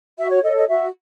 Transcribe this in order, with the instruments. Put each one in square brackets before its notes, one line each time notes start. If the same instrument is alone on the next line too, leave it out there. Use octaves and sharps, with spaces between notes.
[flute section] F#4 E5
C#5
A4 C#5 D#5
D#5
F#4 E5